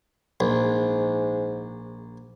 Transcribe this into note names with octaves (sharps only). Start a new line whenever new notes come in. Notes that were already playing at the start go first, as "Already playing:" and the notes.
A#1 G#2